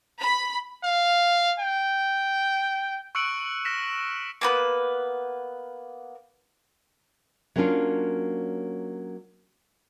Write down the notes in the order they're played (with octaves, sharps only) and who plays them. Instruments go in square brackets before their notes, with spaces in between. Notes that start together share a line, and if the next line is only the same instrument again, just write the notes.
[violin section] B5
[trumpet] F5
G5
[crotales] C#6 E6 F#6 C#7 D7 F#7
F6 A#6 B6 E7
[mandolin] A#3 B3 B4
[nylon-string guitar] F#3 A#3 B3 C#4 D4 F4